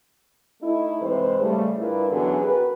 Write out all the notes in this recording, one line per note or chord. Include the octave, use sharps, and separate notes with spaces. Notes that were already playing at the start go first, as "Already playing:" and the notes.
A3 D#4 E4
G#2 C3 E3 G#3 B4 C5
C#3 G3 A3
G2 E4 F4 A#4 B4 D5
F#2 D3 E3 B3 F#4 G#4
F#4 G4 A#4 B4